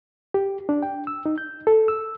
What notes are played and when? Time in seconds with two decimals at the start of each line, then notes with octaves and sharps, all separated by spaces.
0.34 G4
0.69 D4
0.83 G5
1.07 E6
1.26 D#4
1.38 G6
1.67 A4
1.88 E6